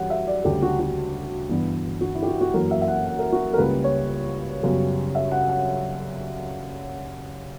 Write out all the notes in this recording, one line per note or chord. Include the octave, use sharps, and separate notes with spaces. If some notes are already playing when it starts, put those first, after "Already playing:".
Already playing: F#2 E3 G3 C#4 F#5
E5
D5
D2 C#3 G3 G4
F#4
F#4
G2 E3 B3 D4
F#4
E4
G4
F#4
E4
F#4
F#2 E3 A#3 A#4
E5
E5
F#5
F#5
A#4
F#4
A#4
C#2 C#3 G3 A#3 B4
C#5
F#2 C#3 G3 B3
E5
F#5
F#5